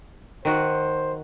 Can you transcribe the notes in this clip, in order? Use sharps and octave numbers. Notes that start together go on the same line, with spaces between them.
D#3 F#4 C5